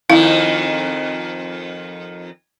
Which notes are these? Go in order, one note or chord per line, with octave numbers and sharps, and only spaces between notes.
F2 D#3 E4 F5